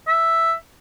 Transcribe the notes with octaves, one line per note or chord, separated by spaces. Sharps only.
E5